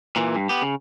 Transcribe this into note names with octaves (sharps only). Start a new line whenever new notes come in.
A#2 E3
G2
B3 G4
C#3